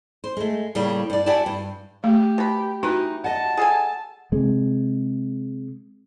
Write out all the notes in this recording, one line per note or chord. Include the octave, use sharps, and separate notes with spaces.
C5
G#3 A3
A2 C#3 G3 A#3
G2 D5
E4 F#4 G4 D5 G#5 A5
G2
A3 G4
B2 B5
E3 D#4 F#4 B4
D#5 F#5 A5
G#4 A4 G#5
C3 G#3